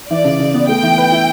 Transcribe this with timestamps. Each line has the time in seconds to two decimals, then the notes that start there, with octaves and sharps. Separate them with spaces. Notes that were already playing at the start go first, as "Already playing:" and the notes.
0.10 E3 D5
0.25 C#3
0.40 C#3
0.54 B3
0.69 A3 G5
0.83 E3
0.98 B4
1.12 E4